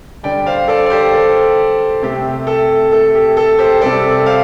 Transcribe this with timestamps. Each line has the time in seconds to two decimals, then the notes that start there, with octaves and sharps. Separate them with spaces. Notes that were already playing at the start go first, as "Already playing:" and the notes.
0.23 D3 G3 D5 G5
0.46 C5 F5
0.68 A4 D5
0.86 D5
0.90 G4 C5
1.14 A4
2.02 C3 A3 G4
2.47 A4
2.92 A4
3.15 G4
3.37 A4
3.58 G4 C5
3.81 C3 G3 A4 D5
4.26 C5 F5